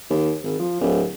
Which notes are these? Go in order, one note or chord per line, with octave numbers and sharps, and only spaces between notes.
D#2
G#1
F3
D1